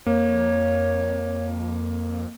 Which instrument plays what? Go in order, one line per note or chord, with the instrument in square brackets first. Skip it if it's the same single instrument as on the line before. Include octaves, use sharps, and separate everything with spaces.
[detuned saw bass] F2 [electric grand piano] A#3 [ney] C#5